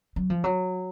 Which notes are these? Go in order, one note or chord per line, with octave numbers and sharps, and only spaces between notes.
F#3
F3
F#3